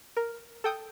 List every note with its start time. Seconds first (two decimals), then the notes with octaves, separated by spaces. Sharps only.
0.17 A#4
0.64 A4 G5 D#6 G6